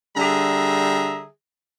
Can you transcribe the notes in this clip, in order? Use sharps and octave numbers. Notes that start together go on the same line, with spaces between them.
D3 G3 G#4 E5 A#5